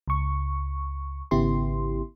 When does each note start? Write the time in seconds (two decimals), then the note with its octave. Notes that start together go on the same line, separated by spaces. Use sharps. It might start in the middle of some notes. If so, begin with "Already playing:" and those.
0.08 C#2 C#6
1.31 G#1 C#3 B3 E4 G4 C6